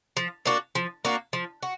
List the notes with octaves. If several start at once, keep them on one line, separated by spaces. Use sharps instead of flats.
F3
A#3 D4 F#4
F3
A#3 D4 F#4
F3
F#4